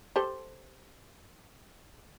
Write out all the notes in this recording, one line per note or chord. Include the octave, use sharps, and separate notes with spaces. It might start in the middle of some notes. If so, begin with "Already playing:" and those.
G4 A4 C5